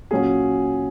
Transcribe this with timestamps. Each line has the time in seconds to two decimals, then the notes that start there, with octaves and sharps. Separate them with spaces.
0.11 A#2 F#3 C#4 G#4